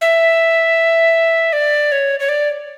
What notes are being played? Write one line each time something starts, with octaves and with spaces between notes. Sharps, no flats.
E5
D5
C#5
C#5
D5